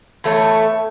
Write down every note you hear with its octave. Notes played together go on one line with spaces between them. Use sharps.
E2 A3 C#5